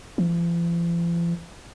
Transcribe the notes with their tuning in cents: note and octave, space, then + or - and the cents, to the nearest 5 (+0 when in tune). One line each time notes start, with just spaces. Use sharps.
F3 -45